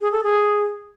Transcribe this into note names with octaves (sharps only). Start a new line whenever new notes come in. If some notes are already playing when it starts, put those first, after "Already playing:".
G#4
A4
G#4